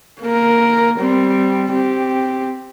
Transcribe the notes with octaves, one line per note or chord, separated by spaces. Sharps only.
A#3 A#4
G3 C4
C4 G4